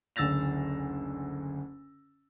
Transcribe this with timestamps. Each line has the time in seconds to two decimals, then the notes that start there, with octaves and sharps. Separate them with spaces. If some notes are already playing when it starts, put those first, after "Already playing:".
0.16 F#1 D2 E6 A6 A#6 F7